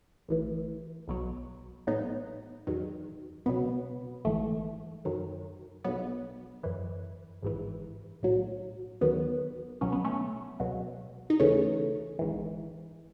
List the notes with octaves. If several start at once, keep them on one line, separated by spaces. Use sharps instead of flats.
A1 A2 E3
B1 B2 F#3
A1 A2 F#3 B3 D#4
E2 D#3 F#3
C#2 B2 F#3 B3
G#1 G#2 E3 A3
F#2 D#3 F#3
B1 B2 F#3 B3
F#2 E3
G#1 G#2 E3
B1 A2 F#3
D#2 D#3 F#3 B3
C#2 B2 F#3 C#4
B3
A3 C#4
C#2 B2 F#3
D#4
D#2 C#3 E3 A3 C#4
G#1 G#2 E3